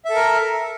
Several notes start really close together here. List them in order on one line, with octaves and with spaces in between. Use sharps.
E5 A4 A#4